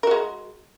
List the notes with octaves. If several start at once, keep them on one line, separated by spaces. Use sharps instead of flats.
G#3 F#4 A#4